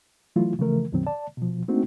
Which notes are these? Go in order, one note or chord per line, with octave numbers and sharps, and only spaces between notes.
E3 F#3 A3 E4 F4
C#3 E3 F3 A3 A#4
C2 F#2 B2 D#3 F#3 C4
D5 A5
B2 F3
A3 A#3 C4 D4 D#4 F#4